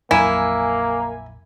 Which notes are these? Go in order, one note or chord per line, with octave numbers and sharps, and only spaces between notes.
A#1 F2 F#3 A#3 E4 G#5